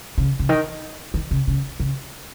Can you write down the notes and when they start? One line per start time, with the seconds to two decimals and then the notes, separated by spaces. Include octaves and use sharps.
0.18 C#3
0.39 C#3
0.49 D#3
1.14 D#3
1.31 C#3
1.47 C#3
1.80 C#3